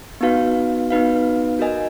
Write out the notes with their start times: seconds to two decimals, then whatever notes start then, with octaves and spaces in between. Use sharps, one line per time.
0.21 B3 D#4 F#4 B4 F5
0.90 B3 D#4 F#4 B4 F5
1.59 F#4 A#4 D#5 G#5